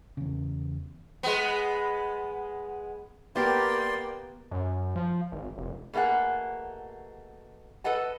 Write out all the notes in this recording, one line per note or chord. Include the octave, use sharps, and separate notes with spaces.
E2 C#3
G#3 B3
A#3 B3 G4 A#4 D5 G5 C6
F#2
F3
G#1
F1
B2 A3 A#3 G#4 F#5
A4 B4 D#5 F#5 A5